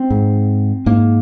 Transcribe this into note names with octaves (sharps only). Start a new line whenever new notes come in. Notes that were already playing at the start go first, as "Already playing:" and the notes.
Already playing: C4
G#2
G#2 A#3